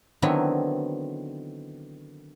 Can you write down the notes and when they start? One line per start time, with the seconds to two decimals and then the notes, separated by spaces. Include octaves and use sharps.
0.22 D3 D#3 F#3 B3 C4 E4